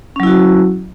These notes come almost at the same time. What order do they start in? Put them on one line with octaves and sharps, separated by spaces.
C#4 F#3 E4 F#4